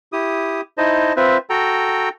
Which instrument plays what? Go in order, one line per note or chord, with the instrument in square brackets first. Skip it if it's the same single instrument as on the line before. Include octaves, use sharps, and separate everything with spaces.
[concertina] E4 G4 D#6
D#4 E4 C5 D#5 A5
C4 F4 B4 C5 E5
F#4 A4 G5 A#5